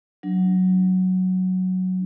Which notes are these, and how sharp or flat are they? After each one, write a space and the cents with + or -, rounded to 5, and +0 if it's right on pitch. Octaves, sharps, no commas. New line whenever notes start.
F#3 +0 D4 +0